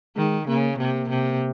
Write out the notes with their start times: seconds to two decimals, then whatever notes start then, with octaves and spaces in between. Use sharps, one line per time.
0.16 D#3 G#3
0.48 C#3 A#3
0.78 C3 A#3
1.09 C3